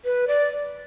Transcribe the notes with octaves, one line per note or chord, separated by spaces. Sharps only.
B4
D5